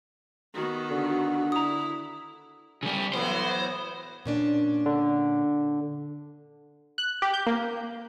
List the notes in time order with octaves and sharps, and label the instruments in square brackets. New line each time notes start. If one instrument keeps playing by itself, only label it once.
[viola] D#3 B3 [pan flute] F#4
[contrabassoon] D3
[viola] E4 [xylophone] A#5 D#6
[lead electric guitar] C#3 G3
[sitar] A2 E3 F#3 [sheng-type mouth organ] B3 [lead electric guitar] C5
[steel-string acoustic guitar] A#2 C#4 D4
[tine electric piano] D3
[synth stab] F#6
G4
G6
A#3